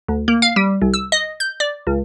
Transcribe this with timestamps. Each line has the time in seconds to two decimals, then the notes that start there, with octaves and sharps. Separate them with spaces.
0.08 D2
0.28 A#3
0.42 F5
0.56 G3
0.82 C2
0.94 E6
1.12 D#5
1.40 G6
1.60 D5
1.87 C#2